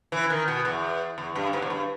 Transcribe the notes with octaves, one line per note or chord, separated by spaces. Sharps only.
E3
D#3
B2
E2
E2
G2
G#2
E2
G2